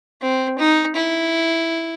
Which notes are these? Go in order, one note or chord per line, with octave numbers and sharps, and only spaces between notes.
C4
D#4
E4